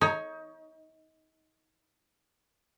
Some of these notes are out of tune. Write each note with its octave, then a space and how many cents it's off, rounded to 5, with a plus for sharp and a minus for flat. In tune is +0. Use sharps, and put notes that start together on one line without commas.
D#4 +25 C#5 +0